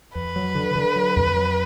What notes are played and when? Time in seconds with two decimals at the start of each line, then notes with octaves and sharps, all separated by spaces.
0.15 F2 B4
0.36 F#3
0.55 D3
0.76 D3
0.96 F#3
1.16 F2
1.36 F#3